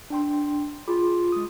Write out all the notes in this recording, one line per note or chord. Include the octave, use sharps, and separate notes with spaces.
D4 G5 C6
F4 G#4 B5 D6
G#3 D#6